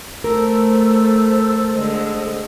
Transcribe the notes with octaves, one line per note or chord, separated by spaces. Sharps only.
A3 A4 A#4 C5 E6
D3 G#3